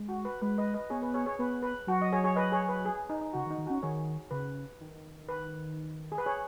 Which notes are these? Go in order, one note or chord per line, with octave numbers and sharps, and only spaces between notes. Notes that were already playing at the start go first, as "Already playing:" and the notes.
Already playing: G#3
F#4
B4
G#3 B4
B4 D#5
B4 D#5
B3 G#4 C#5
B4
G#4 C#5
G#4 C#5
B3 B4
B4
F#3 F#4
D#5
G#4 C#5
G#4 C#5
B4 D#5
G#4 C#5
B4
G#4
D#4
D#4
C#3 F#4
D#3
D#4
D#3
F#4
C#4
D#3 G#4 C#5
C#3 B4
D#3
B4
G#4
B4
G#4 C#5